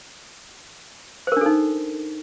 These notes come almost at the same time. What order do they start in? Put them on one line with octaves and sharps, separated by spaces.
C5 A#4 D4 A4 D#4